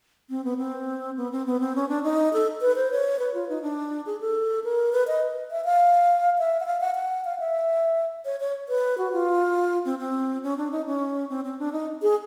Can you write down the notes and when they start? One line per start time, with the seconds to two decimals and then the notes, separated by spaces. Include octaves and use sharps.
0.30 C4
0.44 B3
0.57 C4
1.17 B3
1.32 C4
1.46 B3
1.60 C4
1.75 C#4
1.89 D4
2.03 D#4
2.33 A4
2.61 B4
2.76 C5
2.91 C#5
3.19 B4
3.34 F4
3.49 D#4
3.62 D4
4.06 G#4
4.21 A4
4.64 A#4
4.92 B4
5.07 D#5
5.51 E5
5.65 F5
6.38 E5
6.60 F#5
6.66 F5
6.80 F#5
6.95 F#5
7.25 F5
7.39 E5
8.25 C#5
8.40 C#5
8.68 B4
8.98 F#4
9.13 F4
9.85 C4
9.99 C4
10.43 C#4
10.57 D4
10.71 D#4
10.86 C#4
11.29 C4
11.44 C4
11.59 D4
11.72 D#4
12.02 G#4